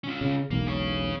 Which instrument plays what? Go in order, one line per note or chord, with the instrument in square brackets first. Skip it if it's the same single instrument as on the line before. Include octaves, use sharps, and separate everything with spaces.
[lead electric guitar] C#4 F4
[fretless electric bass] C#3
[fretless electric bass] E1 B1 [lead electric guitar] A#3
[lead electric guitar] G#4 C#5